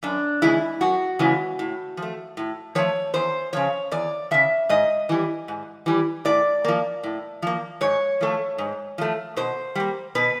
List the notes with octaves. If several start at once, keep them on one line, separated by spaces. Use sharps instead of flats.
F#2 D4
C#3 E3 G#3 E4
F#2 F#4
C#3 E3 G#3
A2
F3 A3
A2
F3 A3 C#5
E2 C5
C#3 F3 C#5
E2 D5
C#3 F3 E5
G#2 D#5
E3 G3
G#2
E3 G3
A2 D5
F3 A#3
A2
F3 A#3
G#2 C#5
F3 A3
G#2
F3 A3
B2 C5
G3 A#3
B2 B4